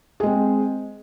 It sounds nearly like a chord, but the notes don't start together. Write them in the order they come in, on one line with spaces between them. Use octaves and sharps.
G#4 G#3 C4